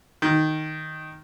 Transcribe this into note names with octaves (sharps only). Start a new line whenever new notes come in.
D#3